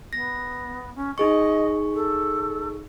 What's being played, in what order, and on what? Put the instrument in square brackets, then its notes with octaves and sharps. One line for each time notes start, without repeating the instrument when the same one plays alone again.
[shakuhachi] B3 [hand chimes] A#6
[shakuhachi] C#4
[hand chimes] D#4 G#4 C#6 [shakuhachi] D#5
[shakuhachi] A4